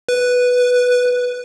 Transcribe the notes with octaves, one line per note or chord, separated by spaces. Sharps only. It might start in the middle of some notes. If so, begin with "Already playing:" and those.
B4